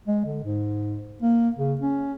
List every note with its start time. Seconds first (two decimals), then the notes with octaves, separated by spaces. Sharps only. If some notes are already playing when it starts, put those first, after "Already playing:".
0.07 G#3
0.25 D3
0.43 G#2
1.22 A#3
1.56 C#3
1.81 C#4